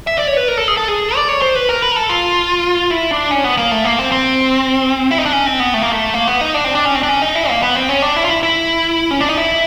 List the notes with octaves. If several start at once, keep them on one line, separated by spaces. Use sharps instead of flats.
E5
D5
C#5
B4
A#4
A4
G#4
A4
G#4
D5
C#5
C5
B4
A#4
B4
A#4
A4
F4
E4
D4
C#4
B3
A#3
A3
A#3
C4
C4
E4
D#4
D4
C#4
C4
B3
A3
A#3
A3
A#3
B3
D#4
D4
C4
D4
C#4
C4
D4
C#4
D#4
E4
A#3
B3
C4
C#4
D4
E4
F4
E4
E4
C#4
D4
D#4
E4